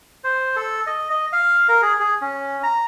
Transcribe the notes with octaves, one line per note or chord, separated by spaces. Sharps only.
C5
A4
D#5
D#5
F5
A#4
G#4
G#4
C#4
A#5